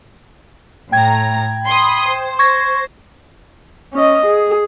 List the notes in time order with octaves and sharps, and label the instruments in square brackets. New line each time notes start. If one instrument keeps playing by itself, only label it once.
[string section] A2 A#5 [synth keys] G5 G#6
[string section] B5 C6 D#6
C5
[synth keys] C#6 G#6 A#6
[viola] C#4 D#5
G#4